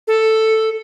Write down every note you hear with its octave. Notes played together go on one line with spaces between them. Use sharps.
A4